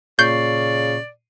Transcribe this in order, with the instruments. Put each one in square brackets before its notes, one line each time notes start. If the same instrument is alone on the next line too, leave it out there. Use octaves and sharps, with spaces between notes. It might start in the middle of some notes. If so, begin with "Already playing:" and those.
[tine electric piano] A#2 C#6 C7 [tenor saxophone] C#3 [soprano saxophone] D5 [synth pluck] G6